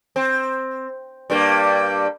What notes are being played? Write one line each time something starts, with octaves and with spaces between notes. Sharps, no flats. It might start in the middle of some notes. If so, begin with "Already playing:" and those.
C4
G2 G3 A#3